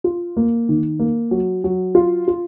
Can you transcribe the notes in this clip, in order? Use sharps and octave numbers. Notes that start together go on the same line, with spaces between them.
F4
A#3
D#3
A#3
F#3
F#3
F4
F4